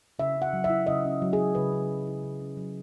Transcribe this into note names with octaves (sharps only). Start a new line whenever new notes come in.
C#3 E5
C#4
F#5
F#3
E5
E4
C#3 D#5
C#4
F#3
G#4
E4
C#3 B4
C#4
F#3
E4
C#3
C#4
F#3